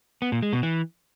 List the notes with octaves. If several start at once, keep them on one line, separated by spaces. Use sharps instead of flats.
B3
A#2
G#3
B2
E3